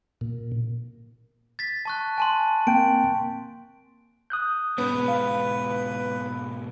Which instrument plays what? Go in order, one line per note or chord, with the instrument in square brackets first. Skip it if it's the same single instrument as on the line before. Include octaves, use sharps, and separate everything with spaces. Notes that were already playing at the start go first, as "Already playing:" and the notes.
[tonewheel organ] A#2
[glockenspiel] A6 B6
A5 C#6 F#6
G#5 A5 C6
[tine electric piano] A#3 C4 G5 [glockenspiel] D7
[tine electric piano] D#6 F#6 G6
[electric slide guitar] G#2 B2 G#3 [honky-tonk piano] B3 [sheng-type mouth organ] B4
[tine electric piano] F5